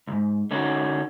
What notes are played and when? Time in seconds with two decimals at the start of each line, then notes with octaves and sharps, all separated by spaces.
0.07 B1 G#2
0.51 D3 C#4 D#4 F#4